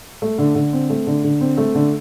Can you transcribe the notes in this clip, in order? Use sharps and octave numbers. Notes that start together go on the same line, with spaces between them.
A3
D3
D3
C4
A3
D3
D3
C4
A3
D3